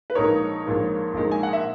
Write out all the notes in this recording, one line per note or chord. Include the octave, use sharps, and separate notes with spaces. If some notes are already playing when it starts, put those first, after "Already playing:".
B4
A#1 A#2 G#3 D#4 A#4 C#5
A#1 A#2 G#3 D#4
A#1 A#2 G#3 D#4
G#5
F#5
E5